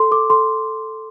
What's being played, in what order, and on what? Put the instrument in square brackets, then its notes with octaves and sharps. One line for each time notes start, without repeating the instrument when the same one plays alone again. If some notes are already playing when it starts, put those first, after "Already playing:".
Already playing: [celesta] A4 C6
A4 D6
A4 C6